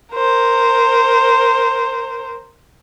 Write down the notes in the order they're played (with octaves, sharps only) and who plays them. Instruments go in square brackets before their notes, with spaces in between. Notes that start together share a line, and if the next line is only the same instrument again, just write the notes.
[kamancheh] A#4 C5